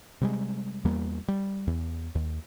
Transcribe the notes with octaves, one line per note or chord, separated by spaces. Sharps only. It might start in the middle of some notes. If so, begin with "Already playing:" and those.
C3 G3 G#3
E2 G3 A#3
G3
E2
D#2